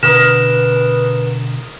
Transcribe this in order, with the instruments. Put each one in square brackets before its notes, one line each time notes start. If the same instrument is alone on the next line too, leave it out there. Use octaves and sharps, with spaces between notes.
[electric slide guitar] B2 D3 F#4 [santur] A#4 D#6 [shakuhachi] B4 [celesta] E7